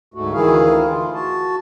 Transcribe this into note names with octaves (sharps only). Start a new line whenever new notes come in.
D2 G#2 A3 F#4
D2 D#3 E3 E4 G#4 F5
F4
F#4 A5